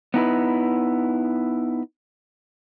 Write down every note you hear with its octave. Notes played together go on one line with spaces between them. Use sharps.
B3 D#4 E4 B4